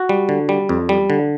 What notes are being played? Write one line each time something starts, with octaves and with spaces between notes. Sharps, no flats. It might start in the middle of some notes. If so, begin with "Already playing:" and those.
Already playing: F#4
G3
D3
G3
F2
G3
D3